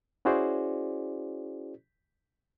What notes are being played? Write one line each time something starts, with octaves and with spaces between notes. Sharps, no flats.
C#4 E4 F#4 G#4 C5 D5